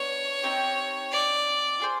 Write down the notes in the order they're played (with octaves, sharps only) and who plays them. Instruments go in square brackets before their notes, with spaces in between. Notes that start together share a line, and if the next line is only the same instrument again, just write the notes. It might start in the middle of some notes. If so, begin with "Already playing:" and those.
Already playing: [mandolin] B3 D4 B4 [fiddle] C#5
[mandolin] C4 D#4 G4
[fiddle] D5
[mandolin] F4 G#4 C5